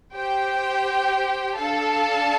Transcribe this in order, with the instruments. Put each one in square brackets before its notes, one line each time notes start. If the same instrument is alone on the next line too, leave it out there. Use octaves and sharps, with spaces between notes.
[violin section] G4 C5 G5
D4 A4 F5 A5